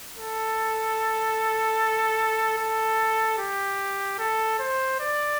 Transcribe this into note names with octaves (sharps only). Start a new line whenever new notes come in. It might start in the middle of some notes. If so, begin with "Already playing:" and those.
A4
A4
G4
A4
C5
D5